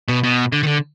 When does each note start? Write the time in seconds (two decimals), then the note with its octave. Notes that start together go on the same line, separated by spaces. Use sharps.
0.08 B2
0.23 B2
0.52 D3
0.63 D#3
0.67 D3